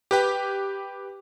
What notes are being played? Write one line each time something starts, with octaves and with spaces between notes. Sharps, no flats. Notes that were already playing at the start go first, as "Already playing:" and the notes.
G4 B4 G5